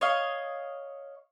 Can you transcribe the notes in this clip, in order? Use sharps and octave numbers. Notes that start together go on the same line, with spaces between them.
C#5 D#5 F5